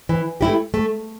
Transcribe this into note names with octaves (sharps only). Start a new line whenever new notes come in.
E3
A3 E4 G4
A3